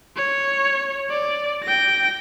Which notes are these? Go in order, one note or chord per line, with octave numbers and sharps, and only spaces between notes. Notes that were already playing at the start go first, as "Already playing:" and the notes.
C#5
D5
G5 A#6